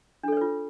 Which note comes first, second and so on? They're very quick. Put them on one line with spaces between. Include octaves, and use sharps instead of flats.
D4 A4 C#5 B4 F4